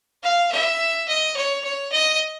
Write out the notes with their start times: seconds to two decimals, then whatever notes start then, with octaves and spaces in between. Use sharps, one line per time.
0.23 F5
0.52 E5
1.08 D#5
1.36 C#5
1.64 C#5
1.92 D#5